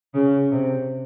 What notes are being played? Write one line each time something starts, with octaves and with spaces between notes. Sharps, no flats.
C#3
C3